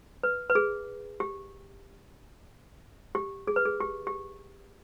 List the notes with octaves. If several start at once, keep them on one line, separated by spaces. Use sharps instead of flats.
B4
B4
G#4
G4
G4
G#4
B4
G#4
G4
G4